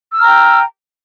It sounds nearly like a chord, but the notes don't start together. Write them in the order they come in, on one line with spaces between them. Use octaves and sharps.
E6 F6 A#5 G5